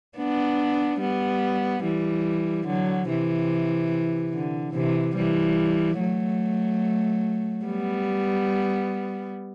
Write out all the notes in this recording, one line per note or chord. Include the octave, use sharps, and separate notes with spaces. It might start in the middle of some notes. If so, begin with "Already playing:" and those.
B3 D4
G3 B3
E3 G3
D3 F#3
C3 E3
D3
C3 E3
E3 G3
F#3 A3
G3 B3